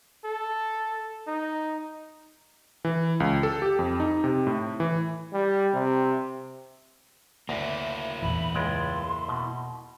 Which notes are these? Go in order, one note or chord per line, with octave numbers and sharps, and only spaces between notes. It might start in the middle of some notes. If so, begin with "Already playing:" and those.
A4
D#4
E3
C#2
A4
G4
F2
D#4
C3
A2
E3
G3
C3
D2 A#3 E4
E2 A#2 E3 B5
C#2 G#3 D5 C6
B2